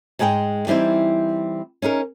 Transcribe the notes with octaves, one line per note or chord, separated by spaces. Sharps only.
G#2 G#3 G#4 A#4 G5
E3 G3 C4 D#4 E4
C#4 D#4 G#4 A#4